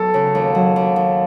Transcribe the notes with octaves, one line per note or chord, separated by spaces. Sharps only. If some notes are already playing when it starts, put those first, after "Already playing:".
Already playing: F#3 B3 A4
C#3
D#2
F#3
D#2
D#2